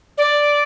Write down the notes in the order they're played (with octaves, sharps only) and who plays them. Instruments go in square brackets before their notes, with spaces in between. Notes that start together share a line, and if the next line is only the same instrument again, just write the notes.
[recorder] D5